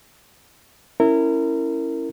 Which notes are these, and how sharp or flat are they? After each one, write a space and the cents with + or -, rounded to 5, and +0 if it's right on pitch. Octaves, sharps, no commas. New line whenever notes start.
C#4 +0 E4 +0 A#4 -25